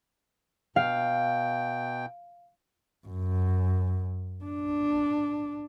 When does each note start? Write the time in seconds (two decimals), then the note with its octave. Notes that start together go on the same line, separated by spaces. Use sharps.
0.76 B2 F5 G5
3.07 F#2
4.44 D4